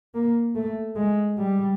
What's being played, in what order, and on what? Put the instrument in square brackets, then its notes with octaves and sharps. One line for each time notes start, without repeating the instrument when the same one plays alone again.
[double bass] A#3
A3
G#3
G3